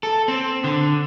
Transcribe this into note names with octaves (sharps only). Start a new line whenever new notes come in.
A4
C4
D3